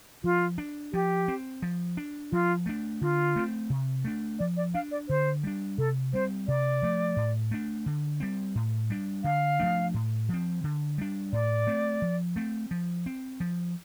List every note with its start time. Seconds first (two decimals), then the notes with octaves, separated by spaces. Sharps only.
0.24 F3 F4
0.58 D4
0.93 F3 G4
1.28 C4
1.62 F3
1.97 D4
2.32 F3 F4
2.66 A3 D4
3.01 D3 F4
3.36 A3 C4
3.70 C3
4.05 A3 D4
4.39 F3 D5
4.57 D5
4.74 D4 F5
4.91 D5
5.09 D3 C5
5.43 G3 D4
5.78 C3 A4
6.13 G3 C4 C5
6.48 C3 D5
6.82 F3 A3
7.16 A2
7.51 A3 D4
7.86 D3
8.20 G3 C4
8.55 A2
8.90 G3 D4
9.24 D3 F5
9.59 F3 A3 D4
9.94 A2
10.29 F3 C4
10.64 D3
10.98 G3 D4
11.32 A2 D5
11.67 A3 C4
12.02 F3
12.36 A3 C4
12.71 F3
13.06 C4
13.40 F3